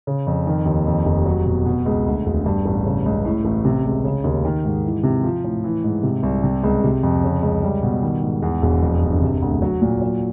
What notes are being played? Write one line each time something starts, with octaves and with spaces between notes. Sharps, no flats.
C#3
F2
D#3
D#2
F2
F1
F#3
B2
B2
C#2
D2
E1
G2
A1
C#3
C#2
A2
A1
C3
C#2
C#3
D#2
D#3
G#2
E3
C3
F3
A2
E3
G#2
C3
C2
C3
C#2
C3
F2
C#3
C#2
G3
B2
D#3
G#2
E2
E1
F2
G1
C3
D2
F#3
A#2
F#3